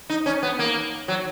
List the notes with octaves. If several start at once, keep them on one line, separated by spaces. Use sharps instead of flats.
D#4
C#4
B3
A#3
F#3